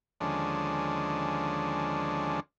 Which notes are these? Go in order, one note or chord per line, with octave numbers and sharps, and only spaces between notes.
D#2 D3 F3 G#3 C#4 D4